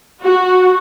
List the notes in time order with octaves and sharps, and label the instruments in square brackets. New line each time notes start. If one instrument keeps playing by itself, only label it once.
[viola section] F#4